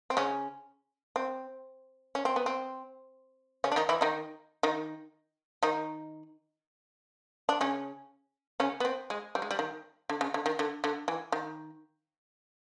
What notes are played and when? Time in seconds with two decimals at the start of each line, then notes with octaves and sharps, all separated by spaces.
0.10 C4
0.17 C#3 C#4
1.16 C4
2.15 C#4
2.25 C4
2.36 B3
2.46 C4
3.64 C#3 C#4
3.72 D4
3.76 D#3 D#4
3.89 E3 E4
4.01 D#3 D#4
4.63 D#3 D#4
5.63 D#3 D#4
7.49 D4
7.61 C#3 C#4
8.60 C#3 C#4
8.80 B3
8.85 C4
9.10 G#3
9.35 G3
9.42 G#3
9.51 G3
9.59 D#3
10.09 D3
10.21 C#3
10.34 D3
10.46 D#3
10.59 D3
10.84 D3
11.08 E3
11.32 D#3